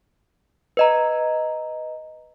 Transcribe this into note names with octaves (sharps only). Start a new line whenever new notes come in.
B4 D#5 A#5